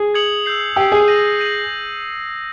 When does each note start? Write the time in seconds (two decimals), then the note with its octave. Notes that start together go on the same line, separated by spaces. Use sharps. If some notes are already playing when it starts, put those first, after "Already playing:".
Already playing: G#4
0.14 D#6 G#6 C#7 F#7
0.46 E6 G6 C7
0.76 G4 E6 G6 C7
0.92 G#4
1.07 G6 A#6 D#7 F#7
1.39 G6 A#6 D#7 F#7